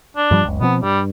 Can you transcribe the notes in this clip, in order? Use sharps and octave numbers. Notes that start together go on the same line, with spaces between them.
D4
G2 F3 G3
F#1 C#2
B2 F3 B3 C4
G2 G3